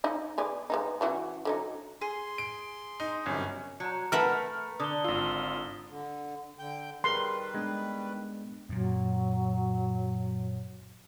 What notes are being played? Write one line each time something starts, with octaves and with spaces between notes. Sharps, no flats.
D#4 D#5
B3 G#4 D5
G#3 B3 D#4
C#3 E3 F#4
D3 F#3 D#4
G#4 C6
D7
D#4
G1 F#2 C3 C#4
F#3 A#5 G6 C#7
A3 A#4 B4 E5 F#5 F6
D3 D#6 F#6 G7
G#1 F4 E6 G7
D3
D3 G5 G6
D#3 G3 G#4 A#4 B4 C6
G#3 B3 D4
F#2 A#2 F#3